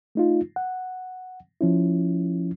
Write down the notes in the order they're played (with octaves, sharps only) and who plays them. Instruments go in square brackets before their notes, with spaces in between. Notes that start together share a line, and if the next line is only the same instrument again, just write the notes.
[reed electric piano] A3 D#4 F4
F#5
F3 C#4 E4